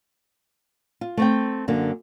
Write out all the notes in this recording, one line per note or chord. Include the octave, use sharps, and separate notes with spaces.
F4
A3 C4 G5
F#2 D3 A#3